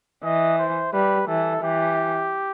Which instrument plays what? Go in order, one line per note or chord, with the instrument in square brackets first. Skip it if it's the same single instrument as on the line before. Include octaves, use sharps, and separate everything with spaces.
[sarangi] E3 [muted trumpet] D#5
[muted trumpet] C5
[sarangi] G3 [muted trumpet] B4
[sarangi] E3 [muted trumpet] A4
[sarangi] E3 [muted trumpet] G4